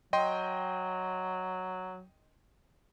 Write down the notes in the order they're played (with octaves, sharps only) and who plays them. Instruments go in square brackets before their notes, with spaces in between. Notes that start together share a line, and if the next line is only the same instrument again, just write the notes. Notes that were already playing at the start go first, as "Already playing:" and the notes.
[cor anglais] F#3 [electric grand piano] D#5 G5 C6